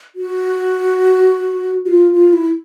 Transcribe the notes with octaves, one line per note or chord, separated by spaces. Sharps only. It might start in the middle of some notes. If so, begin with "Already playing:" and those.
F#4
F#4
F4
F4
E4